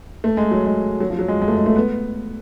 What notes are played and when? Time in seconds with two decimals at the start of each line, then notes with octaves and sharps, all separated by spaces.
0.24 A3
0.37 G#3
0.51 F#3
0.66 G#3
1.00 F#3
1.10 F3
1.19 F#3
1.28 G#3
1.42 G#3
1.48 A3
1.57 G#3
1.66 A3
1.76 B3